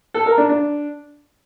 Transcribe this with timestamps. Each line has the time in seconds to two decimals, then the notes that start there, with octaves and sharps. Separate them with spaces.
0.14 A4
0.26 A#4
0.38 D4
0.49 D4